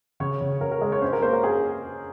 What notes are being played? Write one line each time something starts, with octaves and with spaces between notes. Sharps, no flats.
C#3 C#5
C#3
C#3 A#4
A#4
G#3
C#5
C#4 C5
A#4
A#3 C5
A#4
G#4